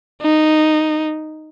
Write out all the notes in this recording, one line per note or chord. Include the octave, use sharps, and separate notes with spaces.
D#4